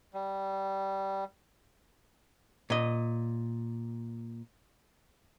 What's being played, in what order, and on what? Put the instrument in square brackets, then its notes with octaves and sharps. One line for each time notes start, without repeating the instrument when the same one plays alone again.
[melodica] G3
[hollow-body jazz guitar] A#2 D#5